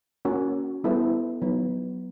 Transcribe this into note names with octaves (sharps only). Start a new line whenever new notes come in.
A#3 C#4 F#4 A#4
G3 B3 E4 A4 C5
F#3 B3 D#4